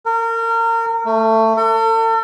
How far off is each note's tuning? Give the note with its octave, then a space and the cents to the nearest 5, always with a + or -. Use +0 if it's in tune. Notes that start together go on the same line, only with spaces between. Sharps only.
A#4 -30
A3 +20
A4 +40